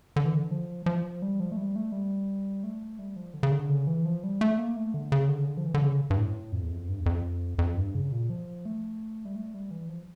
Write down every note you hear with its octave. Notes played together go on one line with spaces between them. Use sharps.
D3
E3
D3
F3
F3
G3
F3
A3
G3
A3
G3
A3
G3
F3
D3
C#3
D3
C#3
E3
F3
G3
A3
A#3
A3
D3
C#3
D3
C#3
D3
F3
E3
D3
C#3
G2
A2
F2
E2
F2
G2
E2
F2
F2
G2
C#3
A#2
F3
A3
G3
A3
G3
E3
F3